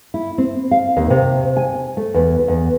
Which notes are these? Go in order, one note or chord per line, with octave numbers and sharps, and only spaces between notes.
E4
C4
F5
D#2
C3
G#5
A3
E2
E2